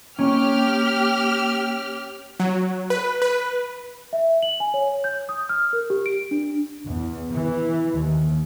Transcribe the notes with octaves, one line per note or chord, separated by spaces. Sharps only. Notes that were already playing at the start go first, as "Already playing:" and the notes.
A#3 C#4 G4 F6
F#3
B4
B4
E5
F#7
G#5
C#5
G6
D#6
F6
A#4
G4
D7
D4
E2
E3
D#2